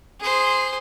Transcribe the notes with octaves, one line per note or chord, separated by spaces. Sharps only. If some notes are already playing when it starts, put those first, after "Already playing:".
G#4 C5